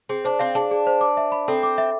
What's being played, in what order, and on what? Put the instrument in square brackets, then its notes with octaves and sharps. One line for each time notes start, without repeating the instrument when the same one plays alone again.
[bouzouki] C4 [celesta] G#4
[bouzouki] D4 [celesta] C5
[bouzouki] C4 [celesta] F5
[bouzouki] D4 [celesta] G#4
[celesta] G#4
C5
D6
E5
B5
[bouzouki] C4 [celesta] A4
[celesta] D6
E5